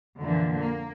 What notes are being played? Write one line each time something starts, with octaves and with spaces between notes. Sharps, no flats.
F2 A#2 D3 E3
A#3